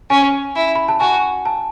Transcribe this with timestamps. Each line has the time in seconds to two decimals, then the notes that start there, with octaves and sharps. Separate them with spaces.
0.10 C#4 G#5
0.56 E4
0.75 B5
0.88 A5
1.00 F#4 G#5
1.46 A5